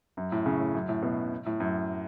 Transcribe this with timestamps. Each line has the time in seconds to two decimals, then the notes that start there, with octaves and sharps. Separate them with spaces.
0.17 F#2
0.32 A2
0.46 C#3
0.60 A2
0.74 F#2
0.89 A2
1.03 B2
1.46 A2
1.60 F#2